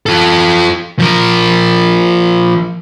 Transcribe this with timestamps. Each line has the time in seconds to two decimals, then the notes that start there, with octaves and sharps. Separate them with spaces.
0.06 F4 A4
0.99 F3 A#4